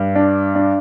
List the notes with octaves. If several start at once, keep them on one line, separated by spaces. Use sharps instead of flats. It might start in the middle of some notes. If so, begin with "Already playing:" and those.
Already playing: G2
D4
D4